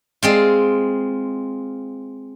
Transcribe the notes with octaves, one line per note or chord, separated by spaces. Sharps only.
G#3 C4 F4